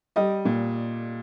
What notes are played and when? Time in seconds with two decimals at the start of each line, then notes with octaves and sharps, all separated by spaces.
0.16 G3 D#5
0.45 A#2